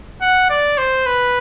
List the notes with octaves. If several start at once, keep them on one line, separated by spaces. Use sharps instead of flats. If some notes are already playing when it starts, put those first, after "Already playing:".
F#5
D5
C5
B4